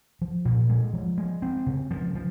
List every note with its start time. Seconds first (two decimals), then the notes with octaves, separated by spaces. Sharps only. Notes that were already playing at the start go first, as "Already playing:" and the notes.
0.21 F3
0.45 A#2
0.70 G#3
0.93 F3
1.18 G#3
1.42 C4
1.66 C#3
1.91 F3
2.15 F3